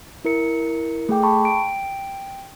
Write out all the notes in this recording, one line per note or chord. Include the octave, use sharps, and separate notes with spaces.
E4 A#4 C#7
A3 G#4 G5 D6
A5 B5 C#6
G5 D7